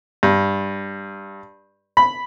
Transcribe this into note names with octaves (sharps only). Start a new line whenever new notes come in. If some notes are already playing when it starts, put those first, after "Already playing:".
G2
B5